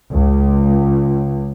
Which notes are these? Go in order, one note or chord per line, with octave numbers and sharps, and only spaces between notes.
C#2